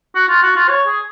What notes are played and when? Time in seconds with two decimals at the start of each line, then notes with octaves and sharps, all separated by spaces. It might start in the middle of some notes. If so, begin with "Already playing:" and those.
0.15 F#4
0.29 F4
0.43 F#4
0.56 F4
0.69 C#5
0.88 G#4